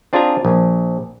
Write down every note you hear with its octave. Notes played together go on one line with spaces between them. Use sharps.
C4 D4 F4 G#4 G#5 A#5
A#1